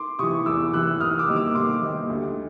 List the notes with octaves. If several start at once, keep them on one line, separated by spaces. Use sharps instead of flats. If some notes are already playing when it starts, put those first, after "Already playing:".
Already playing: C6 D6
C3 E3 C#6 D#6
E2 D6 E6
C3 E3 E6 F#6
C3 D#6 F6
D6 E6
D#3 G3 A#3 D#4
D6 E6
C3 C6 D6
D#3 G3 A#3 D#4
D2